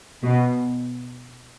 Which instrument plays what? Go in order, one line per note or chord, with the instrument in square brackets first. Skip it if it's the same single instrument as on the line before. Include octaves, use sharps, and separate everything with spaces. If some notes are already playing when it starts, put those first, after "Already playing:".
[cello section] B2